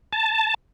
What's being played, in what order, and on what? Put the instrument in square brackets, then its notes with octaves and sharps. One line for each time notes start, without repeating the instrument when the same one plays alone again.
[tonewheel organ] A5